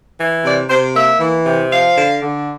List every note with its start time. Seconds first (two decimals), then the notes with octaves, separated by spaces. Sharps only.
0.19 E3
0.44 C3 D5
0.70 C3 C5
0.95 A#3 E5
1.20 E3
1.45 C3
1.71 F3 F5
1.96 D3
2.22 D3